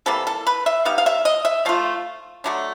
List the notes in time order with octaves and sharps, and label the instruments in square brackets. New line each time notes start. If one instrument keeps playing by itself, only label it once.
[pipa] C3 E3 G3 A#3 A4
A4
B4
E5
G3 B3 D#4 F5
F5
E5
D#5
E5
F3 A3 F4 F5
D3 F#3 A3 D4